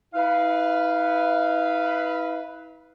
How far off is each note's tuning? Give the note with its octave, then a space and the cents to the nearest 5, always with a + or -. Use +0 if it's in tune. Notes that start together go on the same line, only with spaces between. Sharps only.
E4 -45 B4 +0 F5 -10